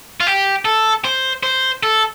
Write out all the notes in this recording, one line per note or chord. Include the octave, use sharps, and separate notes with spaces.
F4
G4
A4
C5
C5
A4